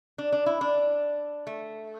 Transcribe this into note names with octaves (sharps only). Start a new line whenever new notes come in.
D4
D4
E4
D4
A3